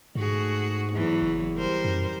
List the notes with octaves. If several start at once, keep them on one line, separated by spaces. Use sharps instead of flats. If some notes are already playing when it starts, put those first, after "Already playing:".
G#2 A3 F#4 G#4
E2 E3 F#3
F#1
G3 A#4 C5
F#2